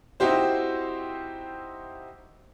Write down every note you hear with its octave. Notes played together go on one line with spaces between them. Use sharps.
C4 D#4 E4 F#4 G4 C5